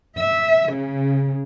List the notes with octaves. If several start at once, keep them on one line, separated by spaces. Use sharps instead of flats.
E5
C#3